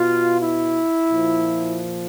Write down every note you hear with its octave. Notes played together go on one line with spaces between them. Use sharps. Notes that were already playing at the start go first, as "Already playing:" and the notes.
Already playing: B2 F4
E4
A#2 F3